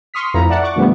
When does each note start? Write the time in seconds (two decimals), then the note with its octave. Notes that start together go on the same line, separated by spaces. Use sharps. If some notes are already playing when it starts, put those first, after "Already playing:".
0.14 C6 C#6 D#6 F6 B6
0.34 F2 A2 E4 F4 B4 A#5
0.50 D5 E5 F#5 A5
0.63 F#5 C#6 D6
0.76 A#2 D3 F3 G3 A3 B3